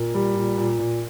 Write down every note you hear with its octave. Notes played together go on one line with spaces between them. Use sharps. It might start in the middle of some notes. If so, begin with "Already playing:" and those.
Already playing: A#2 A#4
G3
A#2
A#2
A#2